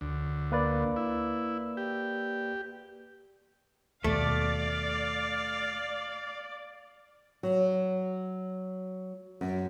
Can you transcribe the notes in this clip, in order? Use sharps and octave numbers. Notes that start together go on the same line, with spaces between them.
D2
A#3 B4 D5
E4
G4
D#2 B2 A3 D5 F5
F#3
F#2